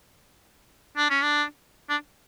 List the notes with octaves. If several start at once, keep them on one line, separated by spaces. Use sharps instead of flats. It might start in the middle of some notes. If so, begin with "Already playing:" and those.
D4
C#4
D4
D4